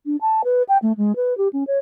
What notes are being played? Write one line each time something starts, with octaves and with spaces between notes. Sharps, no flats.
D4
A5
B4
G5
A3
G#3
B4
G4
C#4
C#5